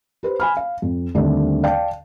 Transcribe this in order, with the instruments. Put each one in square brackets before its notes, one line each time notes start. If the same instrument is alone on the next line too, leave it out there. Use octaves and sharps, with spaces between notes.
[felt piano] G4 B4 C5
G#5 B5 F6
F5
F2
D#2 D3 G3 A3 C4 D4
D5 F5 G5 A5